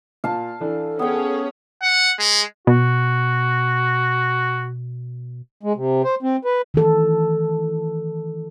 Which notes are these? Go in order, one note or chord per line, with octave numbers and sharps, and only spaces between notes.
A#2 F5 A5
E3 D4 A4
B3 C#4 G#4 C#5 G5
F#5
G#3
B2 F#4
G#3
C3
C5
C4
B4
D#3 E3 A4